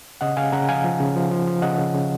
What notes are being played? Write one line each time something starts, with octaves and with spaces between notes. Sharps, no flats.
C#3 D#5 F#5
C#3 F5 G#5
C#3 F#5 A#5
F3 F5 G#5
F3
C#3
F3
F3
F3
C#3 D#5 F#5
C#3
C#3